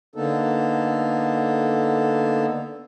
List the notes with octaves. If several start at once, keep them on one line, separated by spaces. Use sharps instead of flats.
D3 A#3 B3 D#4 A4